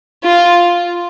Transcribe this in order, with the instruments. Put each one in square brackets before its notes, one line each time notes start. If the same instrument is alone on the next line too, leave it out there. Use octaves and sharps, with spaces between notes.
[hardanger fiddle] F4